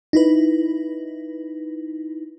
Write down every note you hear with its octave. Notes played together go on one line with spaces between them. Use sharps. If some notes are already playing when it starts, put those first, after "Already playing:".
D#4 E4 B4